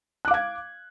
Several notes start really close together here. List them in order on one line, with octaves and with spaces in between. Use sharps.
F#6 D6 F5 G#6